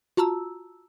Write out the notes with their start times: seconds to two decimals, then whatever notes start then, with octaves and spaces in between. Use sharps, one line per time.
0.17 F4 F#4 A5 A#5 E6